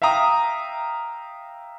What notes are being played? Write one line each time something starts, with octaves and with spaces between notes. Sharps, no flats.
E5 F5 G5 A#5 D#6